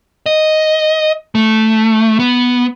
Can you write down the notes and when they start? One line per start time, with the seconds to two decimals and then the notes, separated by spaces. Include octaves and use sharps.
0.26 D#5
1.35 A3
2.20 B3